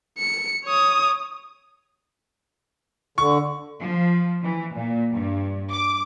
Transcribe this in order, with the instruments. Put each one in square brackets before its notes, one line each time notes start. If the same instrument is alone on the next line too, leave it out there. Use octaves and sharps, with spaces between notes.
[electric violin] C#7
C#5 D#6
[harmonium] D3 [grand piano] C#6
[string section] F3
E3
A#2
G2
D6